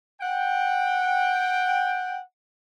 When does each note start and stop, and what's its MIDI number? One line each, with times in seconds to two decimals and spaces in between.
0.21 2.19 78
0.21 2.19 79